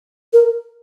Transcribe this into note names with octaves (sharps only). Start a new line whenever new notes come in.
A#4